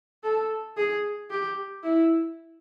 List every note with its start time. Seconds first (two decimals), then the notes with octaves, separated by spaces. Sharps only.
0.24 A4
0.77 G#4
1.30 G4
1.83 E4